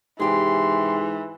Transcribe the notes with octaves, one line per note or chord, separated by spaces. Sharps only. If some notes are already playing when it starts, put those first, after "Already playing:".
G#2 C3 E3 G4 G#4 C6